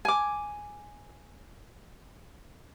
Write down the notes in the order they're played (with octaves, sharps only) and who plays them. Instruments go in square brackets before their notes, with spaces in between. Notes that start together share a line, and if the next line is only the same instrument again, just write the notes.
[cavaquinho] G#5 D6